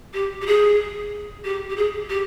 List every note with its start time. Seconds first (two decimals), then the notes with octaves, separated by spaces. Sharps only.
0.13 G4
0.41 G4
0.46 G#4
1.44 G4
1.69 G4
1.76 G#4
2.09 G4